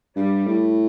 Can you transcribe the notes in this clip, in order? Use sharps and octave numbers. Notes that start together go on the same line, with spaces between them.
G2 G3
A2